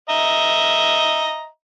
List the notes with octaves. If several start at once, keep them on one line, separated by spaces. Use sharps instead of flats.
D#5 E5 A#5